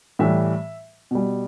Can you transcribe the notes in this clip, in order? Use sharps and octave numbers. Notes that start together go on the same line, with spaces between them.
A2 E3 G3 E5
B2 G3